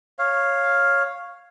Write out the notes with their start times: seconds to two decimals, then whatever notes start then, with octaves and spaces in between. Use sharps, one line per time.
0.19 C#5 F5